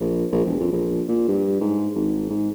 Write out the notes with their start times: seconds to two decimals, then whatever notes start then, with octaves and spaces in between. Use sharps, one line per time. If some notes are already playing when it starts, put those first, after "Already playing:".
0.01 A#1
0.32 A#1
0.45 E1
0.60 F2
0.72 A#1
1.08 A#2
1.28 G2
1.61 G#2
1.95 G#1
2.30 G#2